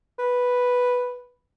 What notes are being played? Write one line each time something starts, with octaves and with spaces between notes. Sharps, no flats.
B4